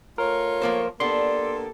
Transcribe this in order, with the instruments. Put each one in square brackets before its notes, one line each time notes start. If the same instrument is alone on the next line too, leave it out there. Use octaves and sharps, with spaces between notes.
[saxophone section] A3 F4 C#5 [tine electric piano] A#4
[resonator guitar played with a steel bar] F3 A#3 C5
[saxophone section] A#3 G4 A4 [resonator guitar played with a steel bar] B3 D4 [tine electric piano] C6